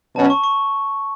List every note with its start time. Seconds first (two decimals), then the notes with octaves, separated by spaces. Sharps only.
0.16 B2 F#3 C#4 A5
0.30 C#6
0.44 C#6